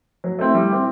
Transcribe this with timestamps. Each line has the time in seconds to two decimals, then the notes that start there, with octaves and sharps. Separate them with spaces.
0.24 F#3
0.39 A3 C4 E4
0.55 G3
0.70 C4 E4 G4